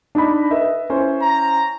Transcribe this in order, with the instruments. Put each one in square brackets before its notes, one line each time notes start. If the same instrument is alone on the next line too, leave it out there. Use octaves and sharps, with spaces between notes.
[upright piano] D4 D#4 B5
B4 D#5 E5
C#4 E4 C5
[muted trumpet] A#5